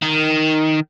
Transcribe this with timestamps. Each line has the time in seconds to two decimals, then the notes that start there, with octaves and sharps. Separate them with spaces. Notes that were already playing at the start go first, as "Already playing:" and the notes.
0.02 D#3